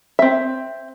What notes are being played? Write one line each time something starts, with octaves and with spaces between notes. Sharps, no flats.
C4 E5